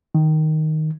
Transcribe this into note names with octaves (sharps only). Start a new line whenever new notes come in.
D#3